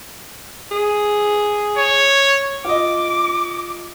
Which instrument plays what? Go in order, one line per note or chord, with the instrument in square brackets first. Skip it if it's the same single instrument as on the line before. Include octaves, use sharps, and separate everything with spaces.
[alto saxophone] G#4
[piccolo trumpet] C#5
[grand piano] F4 D#5 [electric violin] D6